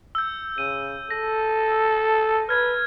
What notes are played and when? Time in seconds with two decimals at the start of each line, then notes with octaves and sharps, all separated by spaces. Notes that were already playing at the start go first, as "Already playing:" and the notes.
0.15 E6 G6
0.58 C#3 D#7
1.11 A4 A#6
2.49 B4 F6 G#6